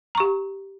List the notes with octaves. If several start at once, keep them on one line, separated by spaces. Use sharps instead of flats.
G4 A#5 C#6